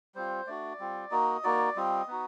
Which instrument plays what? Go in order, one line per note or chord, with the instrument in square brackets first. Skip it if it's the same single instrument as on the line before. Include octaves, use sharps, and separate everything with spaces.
[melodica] G3 C4 F4 C5
A3 D4 F#4 D5
G3 C4 F4
A#3 D#4 F#4 D#5
A#3 D#4 F#4 D5
G3 C4 F4 D#5
B3 D#4 F#4